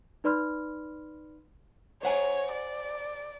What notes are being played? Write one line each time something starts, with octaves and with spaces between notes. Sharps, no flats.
D#4 B4 D5 B5 C6 F6
C5 C#5 F#5 G#5
D5